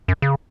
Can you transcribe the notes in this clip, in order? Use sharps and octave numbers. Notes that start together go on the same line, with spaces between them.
F#2
C#3